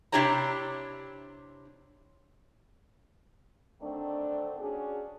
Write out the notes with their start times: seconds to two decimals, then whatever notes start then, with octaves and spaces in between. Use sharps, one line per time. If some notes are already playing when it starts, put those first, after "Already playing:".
0.12 C3 D4 E4 G4 C#5 A#5
3.81 D3 D#3 A3 C4 D4
4.60 C#4 D4 F#4 G#4